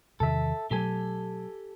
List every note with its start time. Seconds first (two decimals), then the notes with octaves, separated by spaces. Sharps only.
0.20 E2 C3 D#3 A4 E5
0.71 B2 F#3 A3 G4 A4 G#5